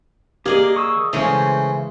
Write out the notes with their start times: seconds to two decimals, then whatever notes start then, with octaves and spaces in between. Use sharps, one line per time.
0.46 A#3 G4 G#4 D5 D#5
0.76 C#6 D#6 E6
1.13 C#3 E3 G#3 A3 C5